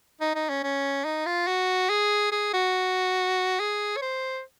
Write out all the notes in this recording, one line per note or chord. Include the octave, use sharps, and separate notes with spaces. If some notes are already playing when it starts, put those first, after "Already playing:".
D#4
D#4
C#4
C#4
D#4
F4
F#4
G#4
G#4
F#4
G#4
C#5
C5